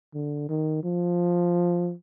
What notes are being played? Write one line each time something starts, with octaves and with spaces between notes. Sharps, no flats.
D3
D#3
F3